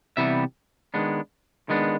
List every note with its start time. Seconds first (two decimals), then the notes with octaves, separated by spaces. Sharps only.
0.17 C3 E3 G3 B3 E5
0.94 D#3 G#3 B3 D4
1.69 D#3 G#3 B3 D4